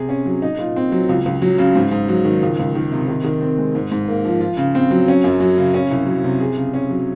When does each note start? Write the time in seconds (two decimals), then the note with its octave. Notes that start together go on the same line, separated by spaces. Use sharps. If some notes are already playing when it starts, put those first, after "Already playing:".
Already playing: C3 G#4
0.09 C#4
0.26 F#3
0.42 D#4
0.59 A#2
0.76 C4
0.92 F#3
1.09 C#2
1.26 C#2
1.42 F#3
1.58 C#3
1.75 G#2
1.91 G#2
2.08 F#3
2.25 D#3
2.42 C#2
2.59 C#2
2.75 D#3
2.92 C3
3.08 D#3
3.24 D#3
3.41 C4
3.58 G#3
3.75 G#2
3.91 G#2
4.08 A#3
4.25 F3
4.41 F4
4.57 C#3
4.75 C4
4.91 F#3
5.08 C#4
5.24 F#2
5.40 F#3
5.57 C#3
5.74 C#4
5.91 C2
6.07 F#3
6.24 C3
6.40 G#4
6.57 C#3
6.74 C#4
6.90 F#3